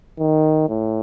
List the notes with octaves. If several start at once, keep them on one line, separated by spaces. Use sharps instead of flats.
D#3
A2